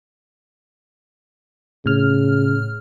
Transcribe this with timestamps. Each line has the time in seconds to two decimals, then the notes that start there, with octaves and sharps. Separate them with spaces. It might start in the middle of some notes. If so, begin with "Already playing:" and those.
1.86 A2 C#3 F6